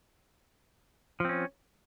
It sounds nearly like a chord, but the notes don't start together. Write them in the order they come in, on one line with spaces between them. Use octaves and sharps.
F3 C4 C#4